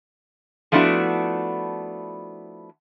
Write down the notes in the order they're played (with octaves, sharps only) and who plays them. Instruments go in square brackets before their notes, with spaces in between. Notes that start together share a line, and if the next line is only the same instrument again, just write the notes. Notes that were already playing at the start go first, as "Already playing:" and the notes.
[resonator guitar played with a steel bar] F3 A3 B3 D4 E4 F#4